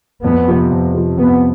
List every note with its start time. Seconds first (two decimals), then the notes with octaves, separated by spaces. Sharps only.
0.24 F2 B3
0.48 C3 F3
0.72 F2
0.94 C3 F3
1.18 F2 B3